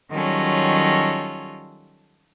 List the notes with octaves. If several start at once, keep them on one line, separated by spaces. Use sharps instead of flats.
D#3 F#3 G3 C#4 F4 A4